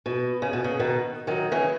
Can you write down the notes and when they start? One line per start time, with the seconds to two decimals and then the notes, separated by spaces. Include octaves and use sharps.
0.06 B2
0.42 C#3
0.53 B2
0.64 C#3
0.79 B2 D#3
1.27 D#3 F#3
1.52 C#3 E3